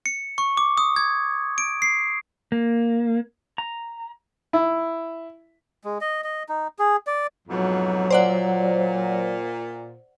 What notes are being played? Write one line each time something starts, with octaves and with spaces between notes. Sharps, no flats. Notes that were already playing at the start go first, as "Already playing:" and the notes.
C#7
C#6
D6
D#6
G#6
D7
C7
A#3
A#5
E4
G#3
D#5
D#5
D#4
G#4
D5
F2 G#2 B2 F#3
A#2 C5 D5 F#5